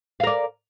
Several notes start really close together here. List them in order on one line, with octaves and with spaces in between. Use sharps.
F5 A#4 D5